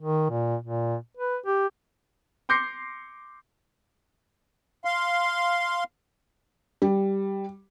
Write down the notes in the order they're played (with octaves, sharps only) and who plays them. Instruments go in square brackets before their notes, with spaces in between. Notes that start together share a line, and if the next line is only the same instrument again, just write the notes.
[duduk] D#3
A#2
A#2
B4
G4
[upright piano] C6 D6 G6 A#6 C7 C#7
[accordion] F5 C6
[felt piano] G3